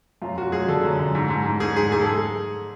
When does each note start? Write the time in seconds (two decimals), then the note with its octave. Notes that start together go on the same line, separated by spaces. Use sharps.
0.22 F#2 F4
0.38 F#2 F#4
0.52 F#2 G#4
0.68 D3 A4
0.84 F#2
0.99 F#2
1.15 G#2
1.30 G#2
1.46 G#2
1.60 G#2 G#4
1.76 G#2 G#4
1.92 G#2 G#4
2.01 A4
2.07 G#4